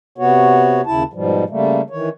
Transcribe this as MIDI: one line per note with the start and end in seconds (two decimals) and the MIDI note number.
0.18 0.81 48
0.18 0.81 59
0.18 0.81 66
0.18 0.81 73
0.86 1.03 39
0.86 1.03 49
0.86 1.03 64
0.86 1.03 81
1.13 1.44 44
1.13 1.44 47
1.13 1.44 53
1.13 1.44 55
1.49 1.81 49
1.49 1.81 55
1.49 1.81 57
1.49 1.81 58
1.90 2.09 51
1.90 2.09 52
1.90 2.09 73